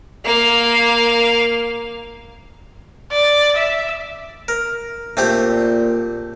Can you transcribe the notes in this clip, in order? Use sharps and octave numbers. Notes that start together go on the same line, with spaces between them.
A#3 F5
D5
E5
A#4
A#2 A3 C4 G4